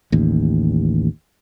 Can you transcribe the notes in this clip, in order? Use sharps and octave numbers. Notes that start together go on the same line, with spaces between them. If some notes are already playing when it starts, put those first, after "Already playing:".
A1 D#2